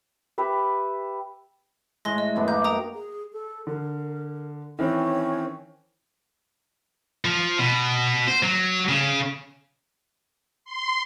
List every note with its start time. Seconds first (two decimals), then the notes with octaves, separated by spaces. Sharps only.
0.38 G4 B4 E5
2.05 A2 G#3 A#6 G7
2.18 D#5
2.36 F#2 B3 D4
2.48 A#3 A#4 G6
2.64 G5 A#5 D#6
2.94 G#4
3.33 A4
3.67 D3 A#4
4.79 D#3 E3 C4 C#4
7.25 F3
7.59 B2
8.28 C5
8.43 F#3
8.89 C#3
10.65 C6